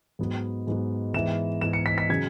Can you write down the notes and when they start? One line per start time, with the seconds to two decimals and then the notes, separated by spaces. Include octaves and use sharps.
0.19 G#2 F#3 B3
0.67 G#2 F#3 B3
1.14 G#2 E3 B3 E7
1.61 G#2 E3 B3 E7
1.73 C#7
1.86 B6
1.98 B6
2.09 C#3 F#3 C#4 G#6